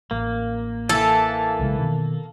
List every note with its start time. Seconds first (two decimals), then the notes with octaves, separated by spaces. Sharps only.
0.11 A1 A#3
0.89 E3 E4 A4
1.59 B1 C#3 G#3
1.79 B2 D#3